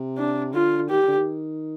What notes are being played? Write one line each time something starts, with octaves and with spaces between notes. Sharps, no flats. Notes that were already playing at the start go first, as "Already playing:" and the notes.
Already playing: C3
D4
D3 F4
D#3 G4
D3
D#3